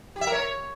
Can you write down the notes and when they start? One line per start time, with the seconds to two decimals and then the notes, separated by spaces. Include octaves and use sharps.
0.16 G4
0.21 E5
0.27 A#4
0.32 C#5